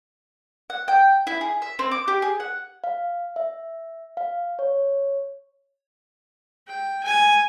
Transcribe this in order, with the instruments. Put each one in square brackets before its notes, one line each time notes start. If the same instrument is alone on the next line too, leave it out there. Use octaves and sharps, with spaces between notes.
[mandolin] F#5
G5
E4
G#4
E5
C4
D6
G4
G#4
F#5
[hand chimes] F5
E5
F5
C#5
[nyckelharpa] G5
G#5